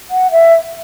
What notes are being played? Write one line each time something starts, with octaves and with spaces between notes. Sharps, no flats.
F#5
E5